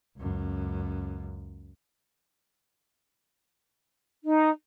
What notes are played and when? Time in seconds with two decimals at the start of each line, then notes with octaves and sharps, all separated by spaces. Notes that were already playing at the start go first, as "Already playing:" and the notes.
0.17 C#2 F#2
4.24 D#4